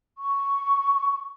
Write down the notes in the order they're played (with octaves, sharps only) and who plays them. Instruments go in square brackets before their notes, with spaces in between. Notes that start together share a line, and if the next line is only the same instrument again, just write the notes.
[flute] C#6